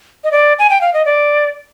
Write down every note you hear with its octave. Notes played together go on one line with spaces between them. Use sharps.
D#5
D5
G#5
G5
F5
D#5
D5